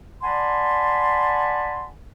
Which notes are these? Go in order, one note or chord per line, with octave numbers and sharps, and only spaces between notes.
D5 F#5 G#5 A5 B5 C6